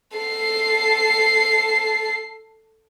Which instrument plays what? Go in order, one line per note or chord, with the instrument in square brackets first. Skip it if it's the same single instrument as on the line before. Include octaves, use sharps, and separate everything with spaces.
[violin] A4 C7